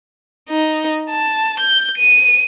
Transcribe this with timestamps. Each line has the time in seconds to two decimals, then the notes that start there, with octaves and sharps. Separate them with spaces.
0.50 D#4
1.10 A5
1.60 G6
1.98 D#7